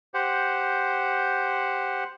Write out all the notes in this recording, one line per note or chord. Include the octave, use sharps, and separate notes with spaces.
G4 C5 F#5